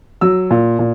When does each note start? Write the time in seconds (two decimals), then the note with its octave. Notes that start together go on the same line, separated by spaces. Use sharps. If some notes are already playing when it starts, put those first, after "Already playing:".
0.21 F#3 E6
0.51 A#2
0.79 A#2